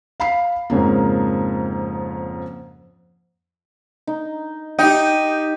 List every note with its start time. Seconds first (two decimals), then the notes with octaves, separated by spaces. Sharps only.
0.20 F5 B5 C7
0.70 F2 G#2 C#3 A#3
4.07 D#4
4.79 D#4 G4 G5